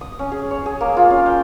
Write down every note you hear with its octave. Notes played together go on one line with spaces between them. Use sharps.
D#6
C#4
G#4
C#5
G#4
A#3
F4
C#4
G5